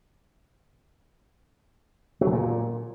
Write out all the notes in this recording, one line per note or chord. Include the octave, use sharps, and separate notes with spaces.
F#3
C#3
A#2